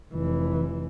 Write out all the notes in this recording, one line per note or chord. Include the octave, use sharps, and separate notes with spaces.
F1 E3